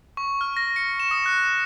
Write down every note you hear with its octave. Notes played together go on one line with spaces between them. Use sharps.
C#6
F6
A#6
C#7
E7
D#6
F#6